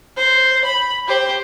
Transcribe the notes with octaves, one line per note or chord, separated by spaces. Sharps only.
C5
B5
G4 C5